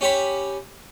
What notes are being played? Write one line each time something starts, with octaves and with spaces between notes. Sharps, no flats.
C#4 G4 C#5 B5